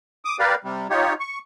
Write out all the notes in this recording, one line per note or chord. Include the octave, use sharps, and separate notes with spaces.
D6 D#6
G4 A#4 B4 D5 F5
C3 G3
D#4 F4 G4 C#5
C#6